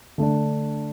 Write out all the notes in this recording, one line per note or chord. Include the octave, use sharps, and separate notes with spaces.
D3 A3 D4